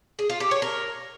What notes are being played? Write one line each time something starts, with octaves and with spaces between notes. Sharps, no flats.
G#4
F4
G4
C#5
A#4